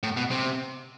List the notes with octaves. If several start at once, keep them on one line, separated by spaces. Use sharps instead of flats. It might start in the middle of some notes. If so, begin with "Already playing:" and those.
A2
B2
C3